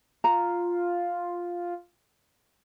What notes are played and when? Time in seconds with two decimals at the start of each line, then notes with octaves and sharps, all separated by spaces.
0.24 F4 A#5